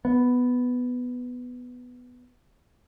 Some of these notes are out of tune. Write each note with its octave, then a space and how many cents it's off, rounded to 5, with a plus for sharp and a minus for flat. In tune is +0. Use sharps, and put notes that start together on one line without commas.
B3 +5